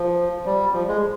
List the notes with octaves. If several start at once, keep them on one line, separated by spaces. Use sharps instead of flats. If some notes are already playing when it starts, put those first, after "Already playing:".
Already playing: F3
G3
F3
G#3